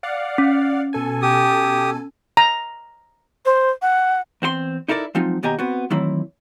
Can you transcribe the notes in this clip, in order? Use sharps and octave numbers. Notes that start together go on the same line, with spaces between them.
D5 F5 F#5
C#4
B2 A4 G#5
G4 D#6
A#5
C5
F#5
E2 C4 F#4 C6
D#4 E4 A4 A#4 D5
F3 F#3 G#3 C4 D#4 F4
D#2 B2 G4 D#5 G#5 A#5
B3 C4 F#4
D#3 E3 F#3 A3 C4 E4